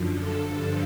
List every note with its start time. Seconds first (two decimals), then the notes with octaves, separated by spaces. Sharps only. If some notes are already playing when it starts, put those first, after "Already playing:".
Already playing: F#2 D3 F3
0.18 A4
0.47 G2 D3 F3 A4